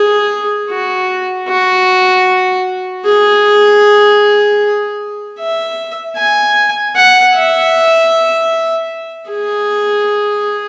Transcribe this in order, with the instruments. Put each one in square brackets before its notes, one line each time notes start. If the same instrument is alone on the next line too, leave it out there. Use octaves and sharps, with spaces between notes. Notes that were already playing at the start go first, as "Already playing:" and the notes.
Already playing: [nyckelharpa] G#4
F#4
F#4
G#4
E5
G#5
F#5
E5
G#4